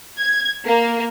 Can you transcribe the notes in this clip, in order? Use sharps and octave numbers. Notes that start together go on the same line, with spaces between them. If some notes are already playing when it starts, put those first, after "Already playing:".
G#6
A#3